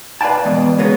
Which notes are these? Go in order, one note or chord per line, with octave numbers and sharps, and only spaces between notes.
B4 D5 F5 G5 A5
E2 G#2 B2
C#3 G#3 A#3 B3